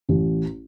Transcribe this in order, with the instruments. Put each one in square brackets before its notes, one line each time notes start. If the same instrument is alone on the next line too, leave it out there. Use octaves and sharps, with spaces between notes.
[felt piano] A1